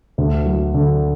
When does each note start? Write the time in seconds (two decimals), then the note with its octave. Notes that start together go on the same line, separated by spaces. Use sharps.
0.18 D2
0.46 F#3
0.74 D3